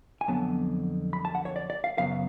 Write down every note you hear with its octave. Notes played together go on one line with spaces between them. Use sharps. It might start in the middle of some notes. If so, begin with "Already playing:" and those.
G#5
F2 D3 F#3 B3 A5
B5
A5
F#5
C#5
D5
D5
F5
F#2 C#3 F#3 B3 F5